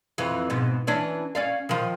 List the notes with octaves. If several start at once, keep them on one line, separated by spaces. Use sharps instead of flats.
F2 E3
G#2 B2
E3 C#4 D4
C#4 D5 F5
D#3 F3